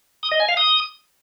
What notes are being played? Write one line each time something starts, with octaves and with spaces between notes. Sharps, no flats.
D#6
D#5
G#5
F5
D#6